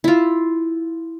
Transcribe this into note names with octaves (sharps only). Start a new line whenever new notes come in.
E4 F4